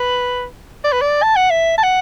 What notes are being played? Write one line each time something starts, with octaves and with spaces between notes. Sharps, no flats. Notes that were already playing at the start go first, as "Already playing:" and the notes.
Already playing: B4
D5
B4
D5
A5
F#5
E5
A5
F#5